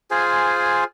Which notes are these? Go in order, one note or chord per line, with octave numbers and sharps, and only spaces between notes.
F4 G#4 C5 G#5